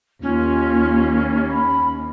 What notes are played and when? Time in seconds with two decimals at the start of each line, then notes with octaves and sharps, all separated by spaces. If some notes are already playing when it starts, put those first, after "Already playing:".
0.22 D#2 C#4 F4
1.50 B5